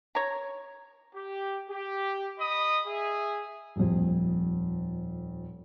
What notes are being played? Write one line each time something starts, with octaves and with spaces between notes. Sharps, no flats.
C#5 A#5
G4
G4
D#5 B5 D#6
G#4 E5
D#1 F2